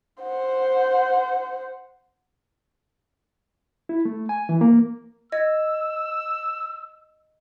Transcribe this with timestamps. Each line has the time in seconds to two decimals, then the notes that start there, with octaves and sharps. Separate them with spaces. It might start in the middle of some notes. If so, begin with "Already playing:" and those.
0.23 C5 F#5
3.89 E4
4.05 A3
4.29 G#5
4.49 E3
4.61 A#3
5.32 D#5 E6 G#6